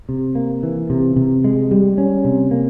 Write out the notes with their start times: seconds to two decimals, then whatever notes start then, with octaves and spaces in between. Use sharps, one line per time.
0.09 C3
0.35 A#3
0.63 E3
0.90 C3
1.16 C3
1.44 G#3
1.71 G3
1.98 C#4
2.25 C3
2.51 A#3